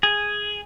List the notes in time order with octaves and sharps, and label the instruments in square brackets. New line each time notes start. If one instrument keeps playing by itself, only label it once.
[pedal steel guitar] G#4